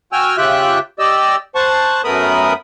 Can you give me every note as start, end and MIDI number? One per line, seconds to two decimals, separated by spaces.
0.12 0.37 66
0.12 0.37 79
0.12 0.37 80
0.12 0.37 88
0.12 0.37 89
0.37 0.79 49
0.37 0.79 65
0.37 0.79 67
0.37 0.79 76
0.37 0.79 79
0.37 0.79 90
0.99 1.36 67
0.99 1.36 74
0.99 1.36 75
0.99 1.36 88
1.55 2.02 72
1.55 2.02 78
1.55 2.02 81
1.55 2.02 85
2.04 2.53 42
2.04 2.53 57
2.04 2.53 59
2.04 2.53 70
2.04 2.53 83
2.04 2.53 87